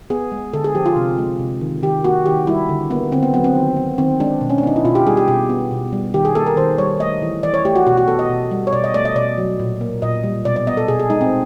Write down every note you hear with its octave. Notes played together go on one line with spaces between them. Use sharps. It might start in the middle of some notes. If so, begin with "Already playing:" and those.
B3 G#4
G#3
D3 A4
G#4
F3 G4
F4
C3
G#3
C3
D#3
D#3 G4
A#3 F#4
D#3 G4
G3 E4
D3
A#3 B3
D3 C4
B3
F#3 B3
C4
D#3
B3
D#3 C4
G#3 D4
B2
C#4
D4
B3 D#4
E4
B2 F4
G4
G3 G#4
G4
B2 G4
B3
B2
G3
D#3 G4
G#4
A#3 A4
A#4
D#3 C5
G3 C#5
A3 D#5
E3
E3 D5
C#5
A3 G4
F#4
B2 F#4
F#4
B3 A4
D#5
B2
G3
C#5
B2 D5
D#5
A3 D5
D#5
B2 D5
F#3
A#2
A#3
A#2 D#5
G3
B2 D5
D5
B3 D#5
A4
B2 G#4
G#4
G#3 D#4
C4